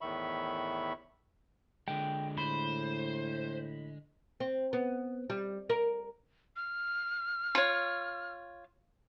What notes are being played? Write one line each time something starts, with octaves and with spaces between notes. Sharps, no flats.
E2 A2 D#3 E5 B5 C#6
D3 G#3 G5
A2 C5 B5
C4
B3
G3
A#4
F6
F4 C#5